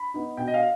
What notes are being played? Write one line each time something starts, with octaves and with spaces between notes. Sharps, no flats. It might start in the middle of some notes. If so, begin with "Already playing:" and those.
Already playing: B5
B3 D#4
B2 G5
D#5
F5